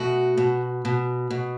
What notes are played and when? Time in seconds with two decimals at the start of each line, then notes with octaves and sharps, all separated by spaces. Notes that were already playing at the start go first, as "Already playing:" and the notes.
Already playing: B2 A3 F#4
0.37 B2
0.85 B2
1.30 B2